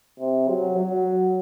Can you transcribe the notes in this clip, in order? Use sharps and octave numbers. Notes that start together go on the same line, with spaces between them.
C3
F#3
F#3